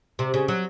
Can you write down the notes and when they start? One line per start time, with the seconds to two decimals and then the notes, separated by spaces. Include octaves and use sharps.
0.19 C3
0.34 C#3
0.48 F#3